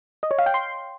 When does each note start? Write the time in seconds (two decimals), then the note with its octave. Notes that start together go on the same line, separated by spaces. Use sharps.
0.23 D#5
0.31 C#5
0.39 F5
0.46 G5
0.54 C6